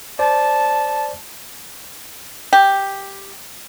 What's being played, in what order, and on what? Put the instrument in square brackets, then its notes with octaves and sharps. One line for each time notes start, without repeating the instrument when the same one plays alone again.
[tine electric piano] C5 D5 [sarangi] A5
[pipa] G4